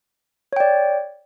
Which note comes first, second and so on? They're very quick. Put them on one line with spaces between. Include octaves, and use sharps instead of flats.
C#5 G5 D5